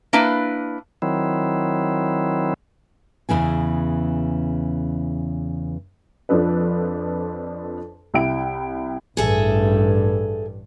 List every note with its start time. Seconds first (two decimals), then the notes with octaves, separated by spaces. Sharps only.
0.13 A#3 D4 E4 B4
1.02 D#3 F#3 C4 E4
3.29 E2 A2 C#3 E3 G#5
6.29 F2 F3 D4 A4 B4
8.14 C2 E4 G5 D7
9.17 A1 G2 G#4 A4 E5